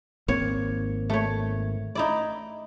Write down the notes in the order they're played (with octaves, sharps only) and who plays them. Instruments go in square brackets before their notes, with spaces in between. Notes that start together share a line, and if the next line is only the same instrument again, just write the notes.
[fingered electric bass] G#1 A#3 C4 [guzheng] C#5
[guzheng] A3 C#5
D#4 E4 D5